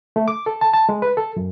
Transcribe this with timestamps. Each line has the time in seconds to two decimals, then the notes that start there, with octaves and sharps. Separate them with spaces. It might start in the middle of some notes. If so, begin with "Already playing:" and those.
0.16 A3
0.28 D6
0.46 A4
0.61 A5
0.73 A5
0.89 G#3
1.02 B4
1.17 A4
1.36 F#2